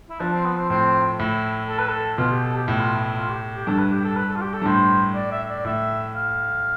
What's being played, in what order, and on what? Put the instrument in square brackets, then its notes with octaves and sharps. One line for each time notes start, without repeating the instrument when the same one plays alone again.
[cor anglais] E4
[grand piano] F3 [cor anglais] D4
[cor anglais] C4
B3
C4
[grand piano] A2 [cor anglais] C4
[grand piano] A2 [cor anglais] E4
[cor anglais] A4
B4
A4
[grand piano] B2 [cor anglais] F4
[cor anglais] G4
A4
G4
[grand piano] A2 [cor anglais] E4
[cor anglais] F4
E4
E4
F4
G4
G4
[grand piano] G2 [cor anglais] A4
[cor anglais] B4
G4
A4
B4
A4
F4
G4
A4
[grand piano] G2
[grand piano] A2 [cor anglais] C5
[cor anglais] D5
E5
D5
[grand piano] A2 [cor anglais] E5
[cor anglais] F5